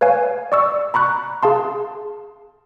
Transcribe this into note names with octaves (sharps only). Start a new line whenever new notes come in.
B4 C#5 F5 G#5
D5 C#6 E6
A#5 B5 C#6 F#6
G#4 F5 A5 C6